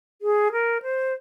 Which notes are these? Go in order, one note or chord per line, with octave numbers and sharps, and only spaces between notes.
G#4
A#4
C5